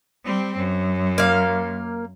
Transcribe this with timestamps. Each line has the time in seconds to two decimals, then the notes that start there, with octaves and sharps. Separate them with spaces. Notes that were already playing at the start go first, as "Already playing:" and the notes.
0.24 G3 C4
0.57 F#2
1.18 A#3 F5